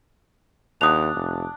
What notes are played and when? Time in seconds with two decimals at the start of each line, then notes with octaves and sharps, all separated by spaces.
0.81 D#2 D4 F#5 D#6 F7
1.15 F1